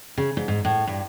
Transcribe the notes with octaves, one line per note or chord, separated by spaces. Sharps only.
C#3
G#2
G#2
A2
G2